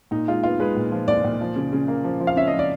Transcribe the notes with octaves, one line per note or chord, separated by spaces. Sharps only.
A#2 D#4
G#3 F4
B3 F4
G#3 B4
A#2
F3
A#2 D5
A#2
F3
C#3
C#3
A#3
F3
F3
F5
C#4 E5
D#5
F3
D5